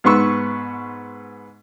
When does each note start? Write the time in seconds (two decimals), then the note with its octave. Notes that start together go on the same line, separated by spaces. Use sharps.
0.04 G#2 B3 C6 C#6 E6